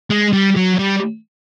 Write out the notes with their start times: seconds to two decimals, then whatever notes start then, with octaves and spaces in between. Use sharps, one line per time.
0.10 G#3
0.33 G3
0.56 F#3
0.79 G3